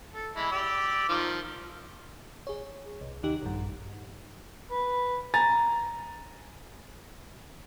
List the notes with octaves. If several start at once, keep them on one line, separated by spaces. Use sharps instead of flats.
A4
E3 G#3 E4
G4 D5 E6
D#3 F3
G#4 C#5
C2
D#2 D#3 D#4 G4
A#1 G2
B4
G#5 A#5 A6